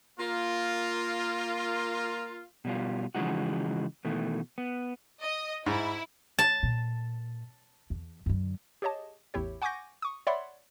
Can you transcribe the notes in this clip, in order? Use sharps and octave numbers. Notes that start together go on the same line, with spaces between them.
A#3 F4
B2 G3 F4
C#3 E3 F3 G#3 D#4 F#4
B2 D#3 E3 A3
B3
D#5
G#2 E4
A5
A#2
E2
F#2 D3
G4 G#4 C#5 D#5 A5
A1 E2 E4 G4 C#5
F#5 G#5 C#6 D6 G6 A#6
C#6 D#6
C#5 D5 E5 F#5 B5 C6